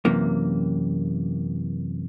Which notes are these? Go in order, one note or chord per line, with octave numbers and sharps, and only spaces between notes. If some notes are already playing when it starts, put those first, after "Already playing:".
F#2 C3 E3 A#3